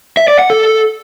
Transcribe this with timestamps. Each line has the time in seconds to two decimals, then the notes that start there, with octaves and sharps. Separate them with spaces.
0.17 E5
0.28 D5
0.39 F#5
0.50 A4